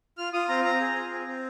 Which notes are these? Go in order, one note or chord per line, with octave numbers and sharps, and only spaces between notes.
F4 F6
F4 D#6
C4 A#5
C4 A#5
G#4
F4
C4
C4